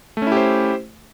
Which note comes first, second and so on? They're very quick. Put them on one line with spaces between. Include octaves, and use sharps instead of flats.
A3 C#4 E4 G4 C5